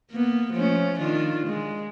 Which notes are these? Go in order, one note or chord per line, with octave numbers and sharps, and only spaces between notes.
A#3 B3
F3 A3 C#4
D#3 D4 F4
G#3